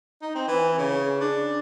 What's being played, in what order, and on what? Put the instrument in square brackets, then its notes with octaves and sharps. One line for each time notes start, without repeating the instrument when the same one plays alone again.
[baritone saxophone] D#4
C4
E3
C#3
D4